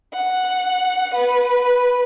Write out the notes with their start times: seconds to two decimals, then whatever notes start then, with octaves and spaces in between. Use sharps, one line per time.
0.14 F#5
1.14 B4